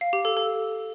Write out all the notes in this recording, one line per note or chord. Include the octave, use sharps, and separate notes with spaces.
F5
G4
A4
A4